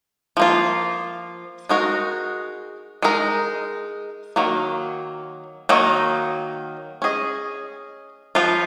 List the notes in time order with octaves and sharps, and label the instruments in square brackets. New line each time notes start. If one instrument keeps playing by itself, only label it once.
[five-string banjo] F3 A#3 F4
G#3 D#4 F#4 A#4
G#3 D#4 A#4
D#3 F#3 A#3
D#3 F#3 A#3 D#4
C#4 G#4 D#5
F3 B3 F4